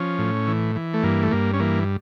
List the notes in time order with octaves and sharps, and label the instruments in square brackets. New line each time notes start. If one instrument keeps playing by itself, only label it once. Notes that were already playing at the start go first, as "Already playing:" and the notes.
Already playing: [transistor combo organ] F3 C#4
A2
E3
E3
A3
G2 A#3
A3
G2 A#3
C#4
E3 A#3